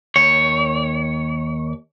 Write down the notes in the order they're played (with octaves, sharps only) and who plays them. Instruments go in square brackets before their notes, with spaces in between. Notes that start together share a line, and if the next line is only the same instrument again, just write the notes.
[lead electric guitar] D#2 C#5